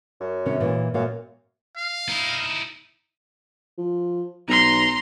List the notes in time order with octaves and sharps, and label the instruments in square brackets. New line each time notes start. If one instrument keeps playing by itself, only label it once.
[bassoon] F#2
[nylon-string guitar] C3 D#3 C#4
A#2 E3
[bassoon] F#2 [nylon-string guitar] A#2 F5
[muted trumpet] F5
[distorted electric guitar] D#4 E4
[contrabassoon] F3
[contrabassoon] B1 [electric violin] A#5 C6